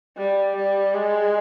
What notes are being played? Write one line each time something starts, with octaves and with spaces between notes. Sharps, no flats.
G3
G3
G#3